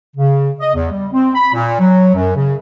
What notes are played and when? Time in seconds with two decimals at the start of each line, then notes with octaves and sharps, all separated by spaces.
0.16 C#3
0.60 D#5
0.74 E2
0.91 G3
1.13 C4
1.35 B5
1.54 A#2
1.80 F#3
2.15 F#2
2.35 C#3